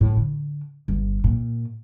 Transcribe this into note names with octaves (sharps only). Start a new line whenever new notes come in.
A2
D3
G1
A#2